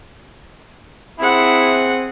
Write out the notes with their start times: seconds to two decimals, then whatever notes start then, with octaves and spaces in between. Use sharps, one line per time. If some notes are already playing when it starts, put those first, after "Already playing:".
1.19 C4 E4 G#4 F#5